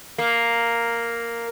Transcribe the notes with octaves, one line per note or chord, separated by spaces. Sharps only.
A#3